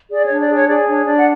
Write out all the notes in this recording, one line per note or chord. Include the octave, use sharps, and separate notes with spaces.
G#4 D5
D4 C#5
D5
G#4 C#5
G#4 D5
D4 C#5
D4 D5
F#5